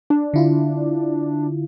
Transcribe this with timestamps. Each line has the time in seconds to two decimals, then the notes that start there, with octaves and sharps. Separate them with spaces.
0.10 D4
0.34 D3 E4 F4